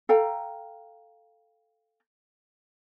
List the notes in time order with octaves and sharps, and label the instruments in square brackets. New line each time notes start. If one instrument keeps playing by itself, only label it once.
[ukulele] A4 F5 G5 A#5